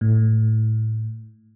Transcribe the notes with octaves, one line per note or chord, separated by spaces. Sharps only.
A2